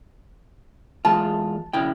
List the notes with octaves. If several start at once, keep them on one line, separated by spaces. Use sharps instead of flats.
E2 G#3 F4 A5
C#3 E4 G5